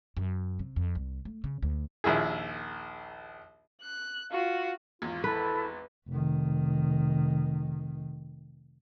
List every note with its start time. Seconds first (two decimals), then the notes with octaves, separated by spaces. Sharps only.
0.17 F#2
0.59 C3
0.76 F2
0.95 C2
1.25 A3
1.44 C#3
1.62 D2
2.04 A#1 D#2 E4 G#4
3.82 F#6
4.31 F4 F#4
5.02 G#1 E2 F4
5.24 E4 A4 B4
6.09 F1 D#3